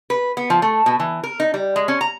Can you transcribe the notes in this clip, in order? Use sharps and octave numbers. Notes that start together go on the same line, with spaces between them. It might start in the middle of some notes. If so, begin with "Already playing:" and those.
B4
B3
F3
A3
B2
E3
A#4
D#4
G3
G#3
C#4
A#5